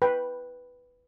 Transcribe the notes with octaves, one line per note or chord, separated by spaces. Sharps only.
B4 G5